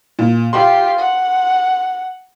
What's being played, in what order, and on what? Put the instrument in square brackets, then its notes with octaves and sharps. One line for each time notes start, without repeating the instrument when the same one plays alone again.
[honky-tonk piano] A#2
[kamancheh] F4 G4 [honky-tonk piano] C6
[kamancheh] F#5